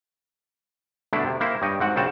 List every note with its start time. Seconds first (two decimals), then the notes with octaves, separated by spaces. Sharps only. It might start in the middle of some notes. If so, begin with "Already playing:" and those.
1.13 B2 D3 A3 D4 E4
1.25 C3
1.40 A#3 E4 C5
1.62 G2 C#5 D#5 G5
1.80 G#2 C4 F#4 F#5
1.96 A#1 C#3 C4 F#4 A5